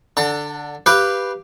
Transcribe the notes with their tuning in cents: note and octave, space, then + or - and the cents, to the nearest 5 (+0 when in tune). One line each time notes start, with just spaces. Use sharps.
D3 +0 A5 +45
G4 +0 B4 +0 F5 -10